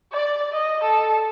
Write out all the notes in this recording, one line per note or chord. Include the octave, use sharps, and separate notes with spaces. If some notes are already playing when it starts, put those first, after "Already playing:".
D5
D#5
A4